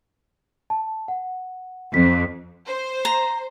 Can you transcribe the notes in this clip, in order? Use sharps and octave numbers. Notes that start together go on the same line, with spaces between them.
A5
F#5
F2 B6
C5
A#5